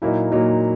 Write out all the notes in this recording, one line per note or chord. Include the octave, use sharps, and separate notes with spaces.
A#2 F#3 A#3 D#4 E4
A#2 F#3 A#3 D#4